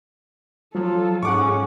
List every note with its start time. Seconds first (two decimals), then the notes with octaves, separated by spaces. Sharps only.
0.75 F3 F#3 F4 A4
1.23 G#2 C#4 G#4 F#5 C#6 D6